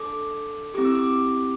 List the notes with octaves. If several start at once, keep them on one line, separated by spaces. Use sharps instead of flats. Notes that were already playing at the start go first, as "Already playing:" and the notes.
Already playing: D4 A4 D6
C4 E4 G4 D6
E6
D6